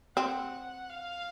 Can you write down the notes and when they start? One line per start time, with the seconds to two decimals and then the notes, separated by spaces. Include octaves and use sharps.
0.16 C4 F#5
0.90 F5